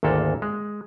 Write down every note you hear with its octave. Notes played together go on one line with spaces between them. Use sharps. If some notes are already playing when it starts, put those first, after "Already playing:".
G#1 D2 A#2 A#3 A4
G#3